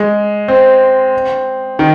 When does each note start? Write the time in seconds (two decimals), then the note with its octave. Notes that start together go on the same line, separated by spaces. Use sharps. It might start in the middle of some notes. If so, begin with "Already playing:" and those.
Already playing: G#3
0.48 C4
1.79 D#3